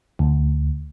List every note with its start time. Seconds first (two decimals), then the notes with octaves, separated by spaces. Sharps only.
0.19 D2